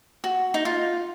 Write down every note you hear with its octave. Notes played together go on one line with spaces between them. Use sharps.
F#4
D#4
F4